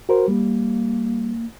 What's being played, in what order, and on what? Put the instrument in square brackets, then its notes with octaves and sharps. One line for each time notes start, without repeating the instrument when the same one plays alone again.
[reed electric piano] F#4 A#4 C5
[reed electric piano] G3 [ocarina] A#3